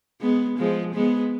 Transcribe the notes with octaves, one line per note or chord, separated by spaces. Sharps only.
G#3 B3
F3 G#3
G#3 B3